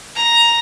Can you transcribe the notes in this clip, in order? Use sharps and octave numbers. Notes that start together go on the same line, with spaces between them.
A#5